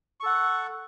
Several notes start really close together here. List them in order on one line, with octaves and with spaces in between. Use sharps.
C#6 A4 F#5